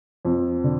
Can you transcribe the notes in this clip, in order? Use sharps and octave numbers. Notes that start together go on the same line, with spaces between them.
F2
D3